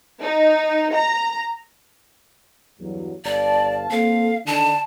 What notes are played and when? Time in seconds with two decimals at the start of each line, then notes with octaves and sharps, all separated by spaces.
0.21 D#4
0.93 A#5
2.80 E2 G2 F#3
3.25 G1 D5 F5 A5
3.91 A#3 C4 A4 F5
4.47 D3 D#3 D4 A5